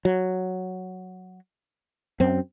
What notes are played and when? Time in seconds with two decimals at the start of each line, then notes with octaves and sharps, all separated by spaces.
0.05 F#3
2.20 F#2 C4